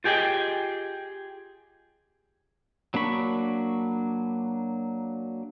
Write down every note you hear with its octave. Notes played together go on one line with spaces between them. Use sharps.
F4 G4 G#4 D#5 G5
F#3 A#3 D4 B5 C#6